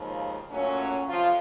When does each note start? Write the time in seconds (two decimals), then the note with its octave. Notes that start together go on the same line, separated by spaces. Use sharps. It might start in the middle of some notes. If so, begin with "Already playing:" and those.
Already playing: D#2 C#3 F3 G#3
0.50 A#2 F#3 A3 C#4
1.09 F2 C3 F3 F4